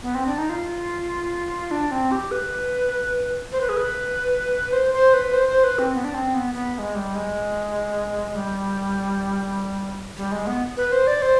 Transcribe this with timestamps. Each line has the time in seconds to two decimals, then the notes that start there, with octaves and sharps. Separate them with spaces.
0.03 B3
0.15 C4
0.27 D4
0.38 D#4
0.50 F4
1.71 D4
1.91 C4
2.11 G4
2.31 B4
3.52 C5
3.61 B4
3.69 G#4
3.77 B4
4.73 C5
4.93 C5
5.14 B4
5.33 C5
5.48 C5
5.64 B4
5.79 C4
5.94 B3
6.04 D4
6.14 C4
6.34 B3
6.54 B3
6.75 B3
6.78 G#3
6.95 G3
7.15 G#3
8.35 G3
10.17 G3
10.32 G#3
10.47 B3
10.77 B4
10.92 C5
11.07 D5
11.22 C5